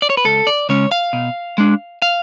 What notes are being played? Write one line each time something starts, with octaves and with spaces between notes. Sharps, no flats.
D5
C#5
B4
C#2 A4
D5
C#3 G#3 C#4 C#5
F5
B2
G#3 D4
F5